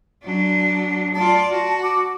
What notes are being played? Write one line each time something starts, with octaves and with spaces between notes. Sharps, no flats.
F#3 D4
F4 D5 A5
F#4
D6